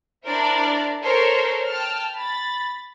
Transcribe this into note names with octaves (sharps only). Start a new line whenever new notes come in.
D4 E4 A#4 C5 D5
A4 A#4 C5 C#5
G5 A5 F6
B5 A6